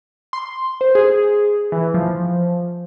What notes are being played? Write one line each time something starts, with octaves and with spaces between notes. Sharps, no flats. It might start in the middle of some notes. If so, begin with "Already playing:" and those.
C6
C5
G#4
E3
F3